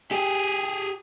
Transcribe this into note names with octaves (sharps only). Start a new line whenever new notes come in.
G4 G#4